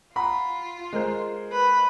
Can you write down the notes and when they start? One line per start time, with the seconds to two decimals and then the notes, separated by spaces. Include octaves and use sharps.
0.16 F4 F#5 A#5 B5
0.93 G#3 A#4 C5
1.52 B4